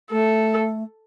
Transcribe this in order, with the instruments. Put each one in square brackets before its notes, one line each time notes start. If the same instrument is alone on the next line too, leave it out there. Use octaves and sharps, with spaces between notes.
[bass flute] A3 [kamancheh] A4